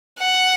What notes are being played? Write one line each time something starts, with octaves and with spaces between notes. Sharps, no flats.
F#5